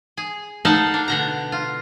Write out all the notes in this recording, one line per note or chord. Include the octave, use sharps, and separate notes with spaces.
G#4
A3 D#4 F5 F#5 A5
D4
B2 D3 A#5
F4